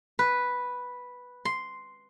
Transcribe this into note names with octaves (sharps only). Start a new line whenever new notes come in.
B4
C6